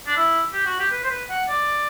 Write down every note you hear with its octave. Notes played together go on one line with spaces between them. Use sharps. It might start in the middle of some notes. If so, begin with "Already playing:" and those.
D4
E4
G4
F#4
G4
B4
C5
B4
F#5
D5